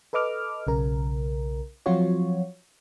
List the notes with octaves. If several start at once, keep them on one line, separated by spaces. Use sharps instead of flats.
A4 B4 D#5 D6 F6
B1 C#3 A#4
F3 F#3 C4 F4 F#4 C#5